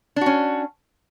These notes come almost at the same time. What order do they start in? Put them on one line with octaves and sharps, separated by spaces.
D4 F#4 C#4